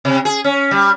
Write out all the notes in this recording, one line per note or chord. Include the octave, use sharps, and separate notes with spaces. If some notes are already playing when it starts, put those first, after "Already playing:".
C3
G#4
C#4
G3